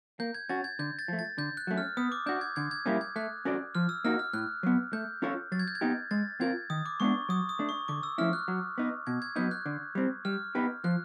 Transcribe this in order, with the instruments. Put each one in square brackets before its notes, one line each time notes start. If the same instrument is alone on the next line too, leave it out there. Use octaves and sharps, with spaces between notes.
[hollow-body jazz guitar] A#3 [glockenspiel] G6
[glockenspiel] G#6
[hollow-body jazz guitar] C#4 F#4 [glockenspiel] A6
[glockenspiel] G#6
[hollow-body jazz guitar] D3 [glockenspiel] G6
[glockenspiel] A6
[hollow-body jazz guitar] F3 A3
[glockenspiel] A6
[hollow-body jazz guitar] D3 [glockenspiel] G6
[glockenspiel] F#6
[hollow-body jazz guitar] F#3 A3 C#4
[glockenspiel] F6
[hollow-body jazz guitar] B3 [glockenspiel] D#6
[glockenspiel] D6
[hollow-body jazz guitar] D4 F#4 [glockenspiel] G6
[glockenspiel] G#6
[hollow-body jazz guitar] D3 [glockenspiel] G#6
[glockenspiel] G#6
[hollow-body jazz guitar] G3 A#3 C#4 E4
[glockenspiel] G#6
[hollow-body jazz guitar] A3 [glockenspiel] F#6
[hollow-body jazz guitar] C#4 F#4 A4 D5
[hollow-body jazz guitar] F3 [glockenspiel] F6
[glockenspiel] E6
[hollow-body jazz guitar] A#3 D#4 F#4 [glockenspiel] F6
[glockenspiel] F6
[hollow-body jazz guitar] A2 [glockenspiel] F#6
[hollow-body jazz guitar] F#3 B3
[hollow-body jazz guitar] A3 [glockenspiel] G6
[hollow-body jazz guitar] C#4 F4 A4 C#5
[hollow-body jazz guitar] F#3 [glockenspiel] A6
[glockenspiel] G#6
G6
G#6
[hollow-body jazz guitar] B3 D#4 G4
[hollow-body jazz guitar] G#3 [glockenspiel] A6
[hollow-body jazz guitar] C4 F4 A#4 [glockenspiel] G#6
[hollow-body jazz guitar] D#3 [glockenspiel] D#6
[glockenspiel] D6
[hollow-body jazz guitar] G#3 B3 D4 [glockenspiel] C#6
[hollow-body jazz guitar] F#3 [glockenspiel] D#6
[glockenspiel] D#6
[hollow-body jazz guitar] A3 D4
[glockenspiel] C#6
[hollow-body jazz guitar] D3 [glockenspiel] D6
[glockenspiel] E6
[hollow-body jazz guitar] F3 A3 C#4 E4 [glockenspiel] F6
[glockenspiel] F#6
[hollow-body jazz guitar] F#3
B3 D#4
[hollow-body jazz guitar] B2 [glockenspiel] G#6
[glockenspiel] G#6
[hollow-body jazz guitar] F#3 B3 D#4 [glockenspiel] G6
[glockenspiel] F#6
[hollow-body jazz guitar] D3
G3 C4
[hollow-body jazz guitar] G3 [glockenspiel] F6
[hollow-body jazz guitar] B3 D#4 G4 B4
[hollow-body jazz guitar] F3 [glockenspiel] F#6